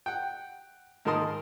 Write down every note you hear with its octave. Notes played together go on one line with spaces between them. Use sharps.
F#5 G5
G#2 D#3 A#4 A5 C6 D#6